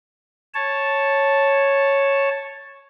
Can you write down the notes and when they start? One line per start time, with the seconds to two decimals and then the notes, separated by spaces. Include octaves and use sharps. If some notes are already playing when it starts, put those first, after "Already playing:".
0.54 C#5 A5